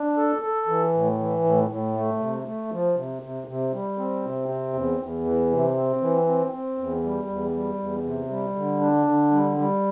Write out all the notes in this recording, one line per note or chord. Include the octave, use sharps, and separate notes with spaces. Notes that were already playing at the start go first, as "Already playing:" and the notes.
Already playing: D4
A4
A4
E3
A2
E3
A2
A2
A3
C3
A3
F3
C3
C3
C3
G3
C4
C3
C4
E2
E2
E3
C3
C4
E3
C4
C4
E2
G3
E2
G3
E2
C3
G3
D3
D4
D3
G3
G3